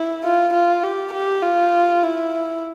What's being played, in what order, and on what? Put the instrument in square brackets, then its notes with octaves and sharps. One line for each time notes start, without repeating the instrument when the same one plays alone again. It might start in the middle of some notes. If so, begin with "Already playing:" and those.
Already playing: [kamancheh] E4
F4
F4
G4
G4
F4
E4